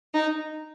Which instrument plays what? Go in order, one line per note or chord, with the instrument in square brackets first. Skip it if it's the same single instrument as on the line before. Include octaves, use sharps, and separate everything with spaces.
[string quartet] D#4